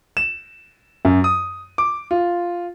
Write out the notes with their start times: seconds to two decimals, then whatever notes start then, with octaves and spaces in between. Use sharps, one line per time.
0.17 E7
1.05 F#2
1.24 D#6
1.78 D6
2.11 F4